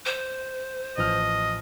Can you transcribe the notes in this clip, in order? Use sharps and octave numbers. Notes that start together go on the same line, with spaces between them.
C5
A1 F3 D#5 F6